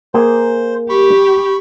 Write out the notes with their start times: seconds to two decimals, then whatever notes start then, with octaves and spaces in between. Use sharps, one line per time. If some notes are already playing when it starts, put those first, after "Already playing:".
0.14 A#3 G#4 C5 G5
0.89 G4 B5 C#6